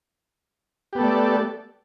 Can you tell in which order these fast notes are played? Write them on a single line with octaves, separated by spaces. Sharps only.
G4 B3 A4 A3 D5